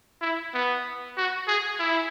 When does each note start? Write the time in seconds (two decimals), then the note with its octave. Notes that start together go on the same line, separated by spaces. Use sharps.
0.21 E4
0.54 B3
1.17 F#4
1.48 G#4
1.79 E4